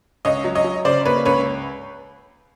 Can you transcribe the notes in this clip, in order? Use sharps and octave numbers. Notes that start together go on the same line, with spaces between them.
C#2 C#5 D#5
F#3
C#5 D#5
F#3
C#3 C5 D5
A#3 B4 C#5
C#2 B4 C#5